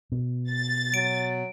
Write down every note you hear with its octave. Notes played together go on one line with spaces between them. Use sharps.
B2
A6
F#3 D7